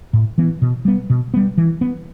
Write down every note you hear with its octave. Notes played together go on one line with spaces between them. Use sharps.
A2
E3 B3
B2
G3 B3
B2
G3 B3
E3
B3